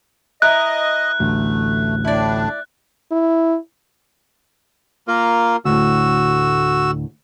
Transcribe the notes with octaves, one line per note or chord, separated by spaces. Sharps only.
E4 A#4 D#5 F#6
A1 D2 A3
A2 D4 E4 D5
E4
A#3 F4 A#4
D2 A2 F#4 E6